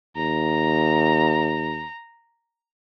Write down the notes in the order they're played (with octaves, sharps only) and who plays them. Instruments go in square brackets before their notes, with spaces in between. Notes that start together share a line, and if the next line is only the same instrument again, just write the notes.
[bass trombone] D#2 [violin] A#5